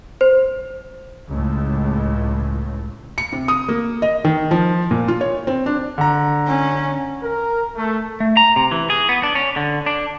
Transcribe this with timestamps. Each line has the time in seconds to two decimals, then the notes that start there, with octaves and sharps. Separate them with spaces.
0.21 C5
1.29 C#2 A2
3.18 C#7
3.33 C3
3.48 D#6
3.68 A#3
4.02 D#5
4.25 D#3
4.51 F3
4.91 A#2
5.08 F4
5.21 C#5
5.47 C4
5.66 D4
5.98 D3 A#5
6.47 C#4
7.22 A#4
7.76 A3
8.20 A3
8.37 A#5
8.56 C3
8.71 E3
8.90 G#4
9.09 B3
9.23 D4
9.35 C#4
9.56 D3
9.86 D4